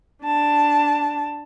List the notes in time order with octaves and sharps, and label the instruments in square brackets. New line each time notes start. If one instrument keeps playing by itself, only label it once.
[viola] D4 A5